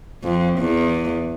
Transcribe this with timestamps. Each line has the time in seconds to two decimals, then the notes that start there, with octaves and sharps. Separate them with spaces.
0.24 F2
0.59 E2